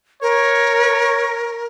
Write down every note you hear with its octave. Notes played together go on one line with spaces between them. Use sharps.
A#4 C#5